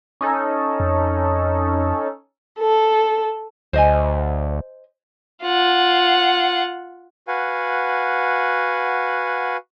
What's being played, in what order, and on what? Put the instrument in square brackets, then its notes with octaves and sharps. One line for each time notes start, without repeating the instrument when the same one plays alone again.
[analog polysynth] C#4 D#4 A4
[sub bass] F2
[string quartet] A4
[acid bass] D2 [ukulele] C5 D#5 G#5
[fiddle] F4 F#5
[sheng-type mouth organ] F#4 B4 F5 F#5 G#5